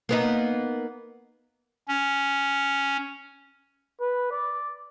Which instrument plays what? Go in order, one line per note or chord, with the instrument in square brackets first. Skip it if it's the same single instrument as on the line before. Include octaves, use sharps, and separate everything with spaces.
[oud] A#3 B3 D#4
[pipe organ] C#4
[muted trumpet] B4
D5